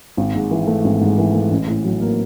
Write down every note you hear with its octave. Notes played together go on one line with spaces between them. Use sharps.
G#1
G#2
E3
A3
G#1
G#2
E3
A3
A1
A2
F#3
A#3